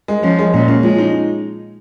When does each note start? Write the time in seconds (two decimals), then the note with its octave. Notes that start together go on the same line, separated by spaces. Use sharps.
0.08 G#3
0.23 F3 C#4
0.39 G#3
0.54 A#2 C#4
0.68 C#4
0.83 F3 G#3
0.98 D#4